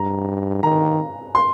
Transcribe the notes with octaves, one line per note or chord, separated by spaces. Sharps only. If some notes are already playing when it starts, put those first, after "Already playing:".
Already playing: G2 A#5
D#3 A#5
C6